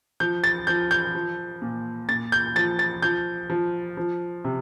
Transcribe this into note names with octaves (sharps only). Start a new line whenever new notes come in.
F3 G6
A6
F3 G6
G6
F3
A#2
A#2 A6
G6
F3 A6
A6
F3 G6
F3
F3
C3